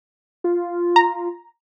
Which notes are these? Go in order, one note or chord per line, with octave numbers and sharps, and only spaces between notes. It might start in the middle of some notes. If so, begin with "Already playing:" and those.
F4
A#5